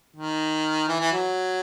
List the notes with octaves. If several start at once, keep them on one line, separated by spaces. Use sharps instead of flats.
D#3
E3
E3
F#3